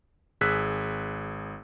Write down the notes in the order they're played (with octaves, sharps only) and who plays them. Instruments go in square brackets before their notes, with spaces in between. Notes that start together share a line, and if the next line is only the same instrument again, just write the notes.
[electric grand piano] G#1 G#4 E6 F#6 B6